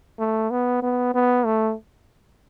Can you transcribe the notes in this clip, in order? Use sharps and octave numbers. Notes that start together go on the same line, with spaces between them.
A3
B3
B3
B3
A3